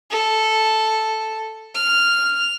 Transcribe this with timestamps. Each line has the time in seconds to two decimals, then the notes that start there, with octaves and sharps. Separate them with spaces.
0.11 A4
1.75 F6